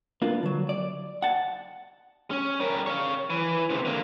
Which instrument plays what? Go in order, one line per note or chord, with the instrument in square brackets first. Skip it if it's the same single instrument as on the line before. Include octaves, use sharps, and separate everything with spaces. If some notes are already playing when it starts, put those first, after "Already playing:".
[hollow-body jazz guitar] A#3 D4 F4 B4
D3 F#3
D5
F#5 A5
[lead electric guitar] C#4
G3 A#4
C#5 F5
E3
C#2 C3
D3 A#3